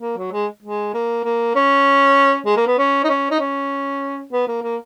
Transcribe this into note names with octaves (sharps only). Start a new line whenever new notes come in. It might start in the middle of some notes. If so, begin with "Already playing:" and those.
A#3
F#3
G#3
G#3
A#3
A#3
C#4
G#3
A#3
B3
C#4
D#4
C#4
D#4
C#4
B3
A#3
A#3